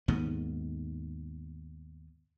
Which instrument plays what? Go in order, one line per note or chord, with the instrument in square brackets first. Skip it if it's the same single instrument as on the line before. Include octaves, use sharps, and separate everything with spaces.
[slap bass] D#2 G#2 B3